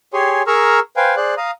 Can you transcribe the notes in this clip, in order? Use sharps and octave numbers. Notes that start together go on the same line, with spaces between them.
G4 G#4 C#5 G#5 C6
G#4 A#4 A#5 C#6 E6 F6
B4 C5 F5 G5 G#5
G#4 C5 D5 F#6
F5 A#5 D#6